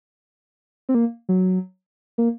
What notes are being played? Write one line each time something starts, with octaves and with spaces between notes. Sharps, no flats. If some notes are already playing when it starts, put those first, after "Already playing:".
C4
A#3
F#3
A#3